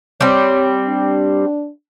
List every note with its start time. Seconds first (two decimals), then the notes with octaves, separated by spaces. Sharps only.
0.21 G3 C4 C#5
0.88 D4